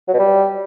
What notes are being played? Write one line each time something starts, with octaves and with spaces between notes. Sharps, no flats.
F#3
B2
G3